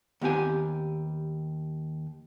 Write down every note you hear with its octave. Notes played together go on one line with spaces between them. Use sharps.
D#2 B3 C4 G4 G#5